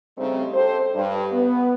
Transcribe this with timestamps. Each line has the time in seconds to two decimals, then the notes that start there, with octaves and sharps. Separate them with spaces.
0.18 C#3 G3 A3 C4 D#4
0.53 G4 A4 C5
0.94 G2
1.31 B3